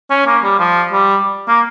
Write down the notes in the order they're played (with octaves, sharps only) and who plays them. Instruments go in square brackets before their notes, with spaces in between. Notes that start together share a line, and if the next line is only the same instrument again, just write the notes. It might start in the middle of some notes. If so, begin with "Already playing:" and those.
[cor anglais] C#4
A#3
G3
F3
G3
A#3